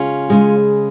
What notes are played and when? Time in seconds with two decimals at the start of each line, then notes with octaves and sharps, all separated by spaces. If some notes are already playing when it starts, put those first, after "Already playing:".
Already playing: C#3 G#3 C#4 F4
0.30 C#3 G#3